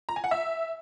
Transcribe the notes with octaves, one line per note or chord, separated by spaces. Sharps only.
A#5
G#5
F#5
E5